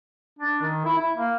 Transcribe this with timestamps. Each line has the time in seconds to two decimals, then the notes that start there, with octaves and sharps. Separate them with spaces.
0.39 D4
0.62 D#3
0.85 E4
0.99 E4
1.16 A#3